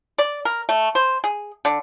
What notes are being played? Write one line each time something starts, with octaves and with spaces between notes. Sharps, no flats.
D5
A#4
A3
C5
G#4
D3